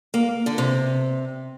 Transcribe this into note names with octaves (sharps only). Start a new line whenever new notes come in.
A#3
D3
C3